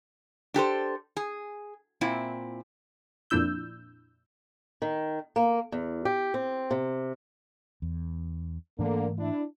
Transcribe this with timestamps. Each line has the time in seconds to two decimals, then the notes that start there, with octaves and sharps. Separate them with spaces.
0.54 D4 G4 A4 C5
1.17 G#4
2.01 A#2 C4 E4
3.30 F2 A#2 D4 E4 E6 G6
4.82 D#3
5.36 A#3
5.72 E2
6.05 G4
6.34 C4
6.71 C3
7.82 E2
8.79 G#2 D3 E3 A3 A#3
9.18 D4 E4